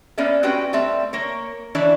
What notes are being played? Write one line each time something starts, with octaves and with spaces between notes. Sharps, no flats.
A#3 B3 C#4 D5 E5
C4 C#4 F#4 G4 B4 G5
G3 A3 C4 E5
A#3 A#4 C#5
E3 D4 E4 C#5 D5